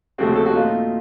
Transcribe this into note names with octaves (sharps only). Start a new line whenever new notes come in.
D#2 C#3 F3 A3 C4 F#4
A4
F#4
A#2 A3 D#4 F4